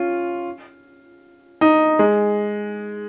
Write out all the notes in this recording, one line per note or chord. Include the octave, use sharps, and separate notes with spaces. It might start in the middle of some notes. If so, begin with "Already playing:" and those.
Already playing: C#4 F4
D#4
G#3